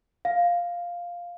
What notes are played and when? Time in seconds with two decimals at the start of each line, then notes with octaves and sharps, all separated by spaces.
0.25 F5